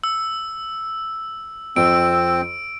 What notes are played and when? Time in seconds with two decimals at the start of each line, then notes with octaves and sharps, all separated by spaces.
0.04 E6
1.76 F2 C4 E6 D7